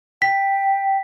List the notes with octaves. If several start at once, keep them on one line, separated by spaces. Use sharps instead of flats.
G5 B6